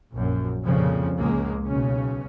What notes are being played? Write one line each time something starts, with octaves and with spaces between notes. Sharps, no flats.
A#1 F#2
C2 F2 A#2 C#3 F3
C#2 G#3 A#3
B1 C#3 C#4